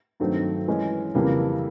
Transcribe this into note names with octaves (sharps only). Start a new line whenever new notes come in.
G2 D#3 F#3 A3 C4
E3 G#3 C#4
F2 C#3 E3 G3 A#3